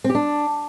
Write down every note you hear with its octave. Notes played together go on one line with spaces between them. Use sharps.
C4
G4
D4